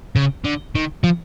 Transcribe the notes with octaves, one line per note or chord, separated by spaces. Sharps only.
C#3
D3
D#3
F3